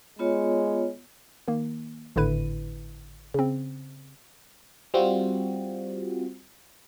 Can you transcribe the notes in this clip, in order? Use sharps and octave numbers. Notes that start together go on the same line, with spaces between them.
G#3 B3 F4 C#5
D#3 A#3
G#1 A2 D3 E4 B4 D#7
C#3 C4
G3 C4 F4 F#4